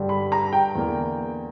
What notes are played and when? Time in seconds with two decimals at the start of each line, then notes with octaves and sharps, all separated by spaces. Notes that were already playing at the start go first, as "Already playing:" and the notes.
Already playing: G2 D3 G3
0.09 B5
0.32 A#5
0.53 G5
0.75 E2 D3 A#3